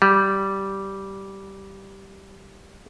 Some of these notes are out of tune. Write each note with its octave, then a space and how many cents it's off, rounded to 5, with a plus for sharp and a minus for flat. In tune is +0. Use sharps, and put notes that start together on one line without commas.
G3 -10